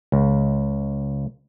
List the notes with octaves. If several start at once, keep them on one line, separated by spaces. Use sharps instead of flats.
C#2